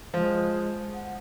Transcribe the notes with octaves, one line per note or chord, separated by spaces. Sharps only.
F3 G#3
F#5